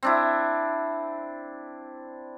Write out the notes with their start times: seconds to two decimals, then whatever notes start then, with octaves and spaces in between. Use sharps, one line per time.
0.03 C4 D4 E4